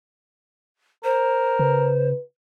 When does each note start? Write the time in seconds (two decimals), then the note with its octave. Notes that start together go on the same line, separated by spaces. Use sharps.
1.04 A#4 C5
1.59 C#3 B4